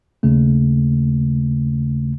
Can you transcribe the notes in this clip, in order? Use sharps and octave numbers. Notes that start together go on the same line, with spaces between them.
D#2 C#3 A3